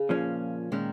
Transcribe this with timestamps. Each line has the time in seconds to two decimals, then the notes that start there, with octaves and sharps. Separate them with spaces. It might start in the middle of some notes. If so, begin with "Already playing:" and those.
Already playing: C#3
0.09 A#2 F3 A#3 C#4
0.72 A#2 D#3 G#3 C#4